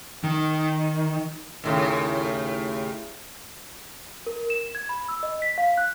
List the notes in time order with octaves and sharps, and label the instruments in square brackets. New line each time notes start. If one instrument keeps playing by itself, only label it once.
[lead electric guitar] D#3
[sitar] D#2 A2 C#3
[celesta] A#4
E7
G#6
B5
E6
D#5
B6
F5
F#6